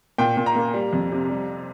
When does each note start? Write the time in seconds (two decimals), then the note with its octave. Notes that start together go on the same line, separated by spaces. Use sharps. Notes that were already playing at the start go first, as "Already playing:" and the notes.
0.18 A#2 G5
0.37 A#2
0.46 A#5
0.56 A#3
0.74 G3
0.93 F2
1.12 C3
1.30 G3